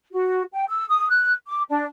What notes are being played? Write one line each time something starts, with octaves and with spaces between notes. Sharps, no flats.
F#4
G5
E6
D#6
F#6
D6
D4